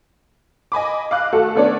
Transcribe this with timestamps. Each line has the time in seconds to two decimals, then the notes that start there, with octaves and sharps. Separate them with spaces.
0.72 D#5 G#5 B5 D6
1.11 F5 D6 F#6
1.33 A3 F#4 A4
1.55 A3 B3 C#4 D4 D5